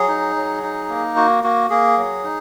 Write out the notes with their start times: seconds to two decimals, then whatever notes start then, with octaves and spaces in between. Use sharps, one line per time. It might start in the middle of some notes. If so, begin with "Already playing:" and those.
Already playing: F#3 G#4
0.08 D#4
0.36 F#3
0.63 D#4
0.89 A#3
1.16 F#4
1.43 A#3 F#4
1.70 A#3 G#4
1.97 F#3
2.24 D#4